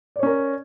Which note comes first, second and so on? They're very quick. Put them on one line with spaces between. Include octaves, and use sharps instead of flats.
D5 C#5 C#4 A#4